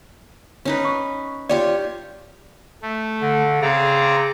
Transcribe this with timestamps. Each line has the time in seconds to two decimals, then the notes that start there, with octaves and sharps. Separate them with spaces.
0.65 C#4 D#4 B4
0.85 C#6
1.49 F4 G4 C#5 D5 G5
2.82 A3
3.22 D3
3.62 C#3 C4 D5 A#5